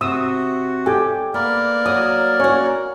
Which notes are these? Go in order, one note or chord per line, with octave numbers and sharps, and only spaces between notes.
C3 F#4 D#6 E6
G4 A4 G5 G#5
A#3 B3 A#4 D5
F#3 D#6
C#4 F#4 C#5